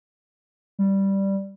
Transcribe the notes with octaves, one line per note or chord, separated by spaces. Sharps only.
G3